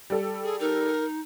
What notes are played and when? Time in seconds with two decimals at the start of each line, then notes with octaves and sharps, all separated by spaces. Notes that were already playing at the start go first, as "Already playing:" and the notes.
0.10 G3 A4
0.44 G#4
0.60 D#4 A#4